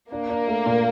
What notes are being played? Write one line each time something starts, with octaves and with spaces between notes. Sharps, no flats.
A#3 D4
D4
A3
A#2